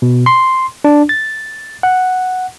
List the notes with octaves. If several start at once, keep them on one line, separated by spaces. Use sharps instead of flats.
B2
C6
D4
A6
F#5